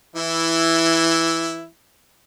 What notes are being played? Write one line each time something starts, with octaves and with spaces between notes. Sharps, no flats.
E3 E4